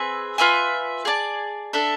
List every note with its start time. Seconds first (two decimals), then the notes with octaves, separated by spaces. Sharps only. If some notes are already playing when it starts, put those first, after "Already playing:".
Already playing: C4 G#4 B4 E5
0.38 F4 B4 E5 G#5
1.05 G#4 D5 A5
1.73 D4 A4 E5